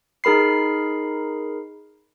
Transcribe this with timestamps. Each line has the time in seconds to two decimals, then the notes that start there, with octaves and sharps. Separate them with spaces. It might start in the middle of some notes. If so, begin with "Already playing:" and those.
0.24 D#4 G#4 A#4 B5 C7